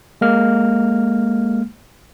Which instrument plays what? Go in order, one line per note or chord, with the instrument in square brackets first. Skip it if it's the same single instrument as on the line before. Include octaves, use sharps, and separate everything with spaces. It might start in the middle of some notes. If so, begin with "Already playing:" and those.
[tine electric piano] G#3 A#3 F6